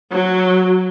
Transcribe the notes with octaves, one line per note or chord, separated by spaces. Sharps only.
F#3